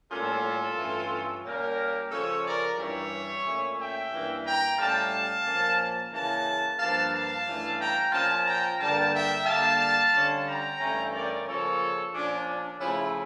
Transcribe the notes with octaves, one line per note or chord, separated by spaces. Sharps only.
A2 G3 A#3 C#4 F4 A4
G2 E3 A3 C#4
A#2 G3 A#3 C#4 G4 A#4
C#3 F3 C#4 A4 C#5
A#4 D5
G2 E3 G3 C#4 C#5 E5
A#2 A3 C#4
E5 G5
G2 E3 A#3 C#4
G5 A#5
A2 G3 C#4 F5 A5
A#2 F3 A#3 C#4
C#3 E3 A#3 C#4 F5 A5
G2 F3 A#3 F5 A5
F5 A5
G2 E3 A3 C#4
G5 A#5
A#2 F3 C#4 F5 A5
G5 A#5
G2 D3 G3 A#3 F5 A5
E5 G5
D3 G3 A#3 F5 A5
D3 G3 C#4
G5 A#5
G2 E3 A3 C#4
A#4 D5
C#3 F3 A#3 C#4 A4 C#5
A#2 F3 C#4 D4
D4
C#3 F3 A3 C#4 E4